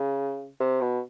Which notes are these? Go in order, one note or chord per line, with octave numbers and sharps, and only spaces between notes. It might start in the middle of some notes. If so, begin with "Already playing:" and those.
Already playing: C#3
C3
B2